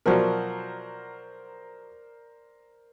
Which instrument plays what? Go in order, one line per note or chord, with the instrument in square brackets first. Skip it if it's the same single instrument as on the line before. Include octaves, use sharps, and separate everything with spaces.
[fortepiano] B2 F3 F#3 [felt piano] A#4 C5 D5